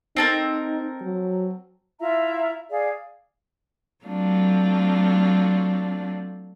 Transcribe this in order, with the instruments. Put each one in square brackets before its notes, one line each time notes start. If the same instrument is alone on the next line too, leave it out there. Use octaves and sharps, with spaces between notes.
[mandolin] C4 A4 A#4 [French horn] D#4
[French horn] F#3
[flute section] E4 F4 E5 A#5
G#4 D5 F5
[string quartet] F#3 A3 C4 D4 F4